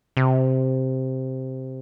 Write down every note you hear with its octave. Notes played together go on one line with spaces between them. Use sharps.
C3